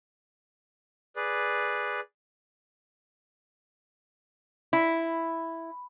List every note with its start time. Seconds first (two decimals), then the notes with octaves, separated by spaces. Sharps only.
1.16 G#4 B4 D5
4.73 E4